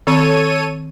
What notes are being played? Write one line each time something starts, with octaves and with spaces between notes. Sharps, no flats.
D#3 C4 A4 C#5 D#7